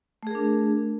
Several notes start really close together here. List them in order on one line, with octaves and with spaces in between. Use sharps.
A3 G#4 A#4 D4